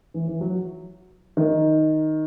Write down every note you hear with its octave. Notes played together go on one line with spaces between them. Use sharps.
E3
E3
F#3
D#3